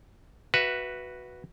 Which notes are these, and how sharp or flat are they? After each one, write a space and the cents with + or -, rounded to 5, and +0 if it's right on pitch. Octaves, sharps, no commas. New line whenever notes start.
F#4 +0 B4 -5 E5 +15